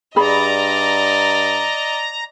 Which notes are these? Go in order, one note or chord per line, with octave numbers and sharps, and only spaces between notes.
G2 G#4 D5 D#5 A#5 B5